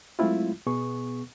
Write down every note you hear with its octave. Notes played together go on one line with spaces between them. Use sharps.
F#3 G#3 A3 C4 E4 F4
B2 B3 G#4 C#6